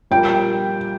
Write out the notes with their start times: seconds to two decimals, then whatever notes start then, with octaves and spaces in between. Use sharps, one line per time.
0.11 A#1 A#2 G3 A#3 G5